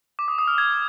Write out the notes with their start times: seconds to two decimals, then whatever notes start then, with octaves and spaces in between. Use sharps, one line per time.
0.19 D6
0.28 D#6
0.38 D#6
0.48 F6
0.58 G#6